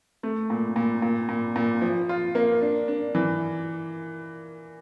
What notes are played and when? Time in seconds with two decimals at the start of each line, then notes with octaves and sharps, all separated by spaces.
0.23 A3
0.50 A#2
0.76 A#2
1.02 A#2
1.29 A#2
1.56 A#2
1.82 F3
2.09 F4
2.35 A#3
2.62 D4
2.88 D4
3.15 E3